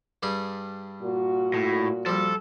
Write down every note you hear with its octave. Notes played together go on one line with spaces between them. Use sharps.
G2 G3 G#4
A#2 F#4
A2
F3 G3 A4